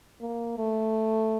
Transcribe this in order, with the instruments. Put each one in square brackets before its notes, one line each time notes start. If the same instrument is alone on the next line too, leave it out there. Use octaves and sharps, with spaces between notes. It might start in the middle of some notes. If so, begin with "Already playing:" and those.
[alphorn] A#3
A3